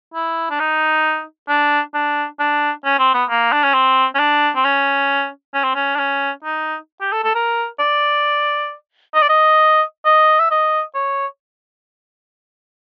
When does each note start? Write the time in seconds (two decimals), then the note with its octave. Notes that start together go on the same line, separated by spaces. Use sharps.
0.14 E4
0.50 D4
0.60 D#4
1.49 D4
1.94 D4
2.40 D4
2.85 C#4
2.99 C4
3.14 B3
3.29 A#3
3.53 D4
3.64 C#4
3.74 C4
4.15 C#4
4.19 D4
4.56 C4
4.65 C#4
5.54 C#4
5.64 C4
5.75 C#4
5.95 D4
5.99 C#4
6.44 D#4
7.01 G4
7.12 A4
7.24 A4
7.35 A#4
7.80 D5
9.14 D#5
9.22 D5
9.29 D#5
10.05 D#5
10.39 E5
10.51 D#5
10.95 C#5